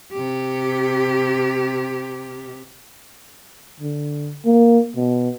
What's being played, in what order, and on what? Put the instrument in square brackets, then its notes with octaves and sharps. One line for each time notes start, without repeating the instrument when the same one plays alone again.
[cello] C3 G4
[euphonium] D3
A#3
B2